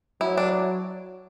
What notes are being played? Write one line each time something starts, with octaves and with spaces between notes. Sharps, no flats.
F#3 E4
D4